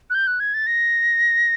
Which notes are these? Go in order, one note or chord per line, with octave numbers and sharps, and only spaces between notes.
F#6
G6
F#6
G#6
A6
A#6